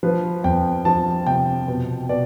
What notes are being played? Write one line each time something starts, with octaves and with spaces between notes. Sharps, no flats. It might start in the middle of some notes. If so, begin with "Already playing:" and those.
F3 B4
F2 G5
F3 A5
C3 G5
B2
B2 D5